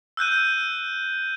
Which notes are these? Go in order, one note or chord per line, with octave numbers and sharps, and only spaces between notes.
E6 F#6 G6 D#7